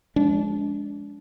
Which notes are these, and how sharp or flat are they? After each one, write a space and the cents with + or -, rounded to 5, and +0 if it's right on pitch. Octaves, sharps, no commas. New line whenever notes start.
F3 +0 G#3 +0 D4 -35